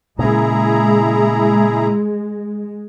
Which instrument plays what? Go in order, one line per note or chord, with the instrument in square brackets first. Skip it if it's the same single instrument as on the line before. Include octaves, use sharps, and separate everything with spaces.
[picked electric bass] A#2 C#3 [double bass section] G#3 [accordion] E4 G#4 A#5